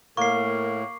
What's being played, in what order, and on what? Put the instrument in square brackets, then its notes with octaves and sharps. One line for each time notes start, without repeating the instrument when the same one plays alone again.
[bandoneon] A2 [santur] A#3 [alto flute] A#4 [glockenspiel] C#6 C7